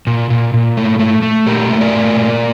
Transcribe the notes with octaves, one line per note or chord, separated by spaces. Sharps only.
A#2
A#2
A#2
A3
A3
A3
A#2 G4 A#4
A3
A#4 D5
A#2
A#2